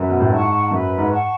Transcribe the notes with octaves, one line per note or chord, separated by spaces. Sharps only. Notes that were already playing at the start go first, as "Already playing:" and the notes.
Already playing: F#2 B4
B2
A2
G#2 F#5 A5 C#6
F#2 B4
G#2
F#5 A5 C#6